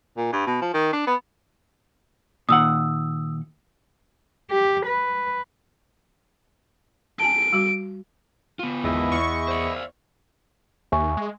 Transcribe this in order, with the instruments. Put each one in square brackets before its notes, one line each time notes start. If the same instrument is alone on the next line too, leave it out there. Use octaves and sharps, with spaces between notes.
[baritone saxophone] A#2
G2
B2
F3
D#3
D4
B3
[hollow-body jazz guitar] A#2 D#3 F#5 [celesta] D#6 E6
[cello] G4
B4
[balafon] G#5 A5 [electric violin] D7
[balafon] G3 F#4 D6
[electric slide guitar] B3 F4
[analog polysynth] G#1 E2 [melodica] E4 D#5 E5
[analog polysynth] E2 C#6
[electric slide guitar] C5 D5
[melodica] E5 F5
[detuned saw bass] D#2 [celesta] E5 G#5 C#6
[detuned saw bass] G#3